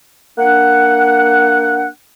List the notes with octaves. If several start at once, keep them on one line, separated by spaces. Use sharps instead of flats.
A#3 D4 F#5